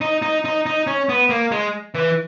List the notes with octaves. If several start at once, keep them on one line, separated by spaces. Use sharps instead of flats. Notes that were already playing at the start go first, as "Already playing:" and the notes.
D#4
D#4
D#4
D#4
C#4
B3
A#3
G#3
E3